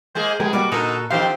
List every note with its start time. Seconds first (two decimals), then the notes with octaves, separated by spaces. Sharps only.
0.15 G#3 A#3 G#4 C5
0.40 F2 G#3 B3 G4 G#4 A#4 G#5
0.53 B2 G3 A#3 F#4 D5 D6
0.72 A#2 D3 D#4 A4 A#4
1.10 F#2 D3 D#3 F3 C4 G4 F5 C6